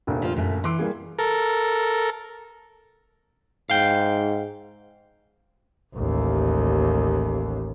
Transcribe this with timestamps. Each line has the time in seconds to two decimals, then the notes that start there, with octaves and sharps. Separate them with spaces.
0.07 F1 D2 A#2
0.22 F3 F4
0.36 F#2 A3
0.64 E3 C6 D6
0.78 G3 A#3 G#4
1.19 A4 A#4
3.70 G#2 F5 G5
5.95 A1 D#2